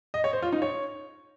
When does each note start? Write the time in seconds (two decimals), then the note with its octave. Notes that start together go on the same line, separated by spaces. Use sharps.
0.14 D#5
0.24 C#5
0.33 C5
0.42 F4
0.53 D#4
0.62 C#5